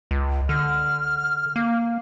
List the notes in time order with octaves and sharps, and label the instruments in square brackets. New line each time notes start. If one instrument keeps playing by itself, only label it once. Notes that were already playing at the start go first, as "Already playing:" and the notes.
[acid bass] C#2
[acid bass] D3 [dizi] F6
[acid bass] A#3